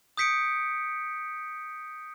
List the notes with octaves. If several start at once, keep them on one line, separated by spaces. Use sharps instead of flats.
D#6 G6 B6 C#7 D7